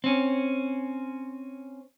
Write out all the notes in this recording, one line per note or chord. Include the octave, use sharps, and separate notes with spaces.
C4 C#4